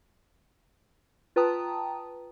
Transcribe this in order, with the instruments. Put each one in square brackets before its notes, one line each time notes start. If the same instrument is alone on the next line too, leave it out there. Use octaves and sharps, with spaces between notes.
[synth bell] F4 B4 G5 A5 A#5 D#6